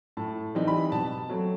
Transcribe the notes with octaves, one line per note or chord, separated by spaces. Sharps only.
A2 A5
E3 G3 C4 D#4
B5
B2 A5
F#3 A3 C4